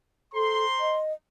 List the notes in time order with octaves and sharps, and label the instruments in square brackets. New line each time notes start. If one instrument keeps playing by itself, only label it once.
[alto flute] A4 [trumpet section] C5 A#5 C6
[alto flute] D#5